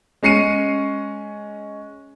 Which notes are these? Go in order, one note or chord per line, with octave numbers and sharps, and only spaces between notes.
G#3 C#4 C7 C#7 D#7